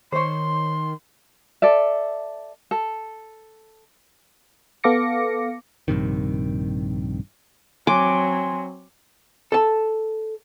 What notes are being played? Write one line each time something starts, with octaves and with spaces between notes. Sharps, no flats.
D#3 C5 C#5 C6
A4 D5 E5
A4
B3 A4 F5 D6 A#6 C#7
A#1 G2 C3 D#3
F#3 C4 G#5 C6 D6
A4 A5